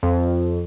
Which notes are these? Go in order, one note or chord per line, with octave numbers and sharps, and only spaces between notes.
F2